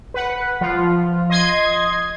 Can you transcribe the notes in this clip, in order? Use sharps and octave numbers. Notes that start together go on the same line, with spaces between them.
B4 F#5
F3 F4
D#5 C6 G#6